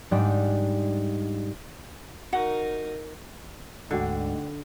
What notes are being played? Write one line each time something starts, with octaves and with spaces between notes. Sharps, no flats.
G#2 G3 D4 D#4
D#4 F#4 A#4 F#5
D2 G#2 D3 G#3 D4 F#4 G5